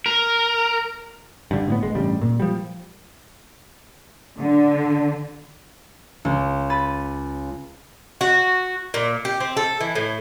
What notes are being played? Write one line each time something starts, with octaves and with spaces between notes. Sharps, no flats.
A#4
G2 D3
A2 B3
G1 G#3
A1 G2 C#3 G3
A#2
F3 G3
D3
C#2
B5 A6 D#7
F#4
A#2
G4
C4
A4
E3
A2